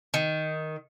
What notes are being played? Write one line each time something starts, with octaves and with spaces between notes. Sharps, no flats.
D#3